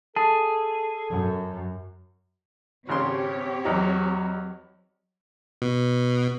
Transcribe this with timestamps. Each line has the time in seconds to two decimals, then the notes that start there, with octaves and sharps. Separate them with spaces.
0.16 G#4 A4 A5
1.10 F#2
2.89 G#1 C#3 C4 G4 C#5 C6
3.65 E2 F#3 D#4
5.62 B2